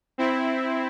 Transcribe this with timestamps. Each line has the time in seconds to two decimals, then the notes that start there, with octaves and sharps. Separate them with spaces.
0.18 C4 E4